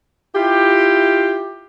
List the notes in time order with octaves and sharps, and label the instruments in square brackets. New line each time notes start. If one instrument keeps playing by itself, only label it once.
[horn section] E4 F4 G4